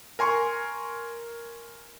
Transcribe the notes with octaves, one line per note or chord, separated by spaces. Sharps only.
A#4 G#5 C6 C#6